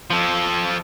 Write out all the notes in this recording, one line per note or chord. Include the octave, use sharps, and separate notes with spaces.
F3 A4